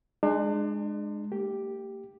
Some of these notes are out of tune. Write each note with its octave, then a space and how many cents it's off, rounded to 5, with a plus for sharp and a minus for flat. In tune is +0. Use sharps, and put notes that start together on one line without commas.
G#3 +0 D4 +35
A#3 -40 G4 +0